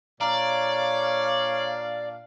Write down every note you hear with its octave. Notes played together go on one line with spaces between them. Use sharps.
A#2 D4 C#5 D5 F5 A#5 F6